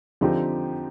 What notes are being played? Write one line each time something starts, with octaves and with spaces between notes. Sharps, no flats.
D3 F3 C4 D#4 G4